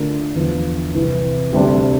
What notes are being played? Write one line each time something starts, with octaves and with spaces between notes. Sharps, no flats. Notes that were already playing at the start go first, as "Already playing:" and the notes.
Already playing: D3 A3 D4 F4 A#4
E2 D3 F3
C2 C3 E3
D2 C3 G3 D4 G4